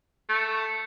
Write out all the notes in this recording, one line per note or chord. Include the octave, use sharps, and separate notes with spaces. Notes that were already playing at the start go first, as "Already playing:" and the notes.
A3